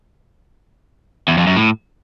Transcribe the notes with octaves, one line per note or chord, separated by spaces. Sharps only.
E2
F2
F#2
A2